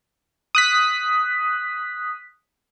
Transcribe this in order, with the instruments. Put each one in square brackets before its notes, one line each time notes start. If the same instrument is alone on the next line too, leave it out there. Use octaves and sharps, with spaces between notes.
[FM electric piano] D#6 F#6 B6